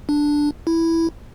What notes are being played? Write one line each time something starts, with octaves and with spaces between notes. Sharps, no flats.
D4
E4